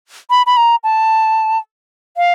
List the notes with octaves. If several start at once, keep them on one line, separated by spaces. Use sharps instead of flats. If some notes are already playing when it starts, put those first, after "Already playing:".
B5
B5
A#5
A5
F5